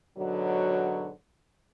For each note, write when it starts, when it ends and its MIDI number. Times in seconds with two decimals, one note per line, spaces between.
0.18 1.10 44
0.18 1.10 47
0.18 1.10 50
0.18 1.10 54